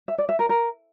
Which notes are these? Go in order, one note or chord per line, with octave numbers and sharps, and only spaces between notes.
E5
D5
E5
A#4
A#4